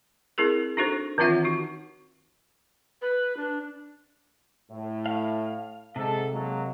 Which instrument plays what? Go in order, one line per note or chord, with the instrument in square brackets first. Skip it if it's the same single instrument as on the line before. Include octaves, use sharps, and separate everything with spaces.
[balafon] C4 E4 G#4 A#4
D4 D#4 F#4 A4 C5
D#3 E3 C4 F4 E5 F#5
D#4 F#4
[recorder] B4
D4
[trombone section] A2
[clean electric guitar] F5
[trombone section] G#2 A4 [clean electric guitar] C3
[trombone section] F#3 G#3 A#3